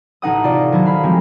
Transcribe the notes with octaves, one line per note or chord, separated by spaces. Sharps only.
A1 D#4 F#5 D#6
C3 F4 A4 D5 C#7
D#3 F#3 D#4 E4
F5 B5 F6
F3 G3 G#3 C4 F#4